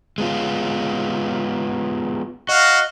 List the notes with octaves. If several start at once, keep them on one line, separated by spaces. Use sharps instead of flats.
G#3 B3 F4
F#4 D#5 F5